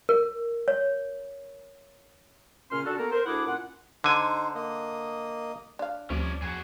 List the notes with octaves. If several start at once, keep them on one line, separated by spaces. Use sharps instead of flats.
A#4
C#5
A#2 C#3 C#4 C6 F6
D4 F#4 A4
A#3 B3 A4 A#4
A#4 C5
D2 D4 E4 G#4 F#5 D6
A#2 C#4 F4 F#5
D3 D#4 C5 G#5
A#3 D#5
D4 F5
D2 F3 G3 C4 C#4 D5
F2 F#4 G#4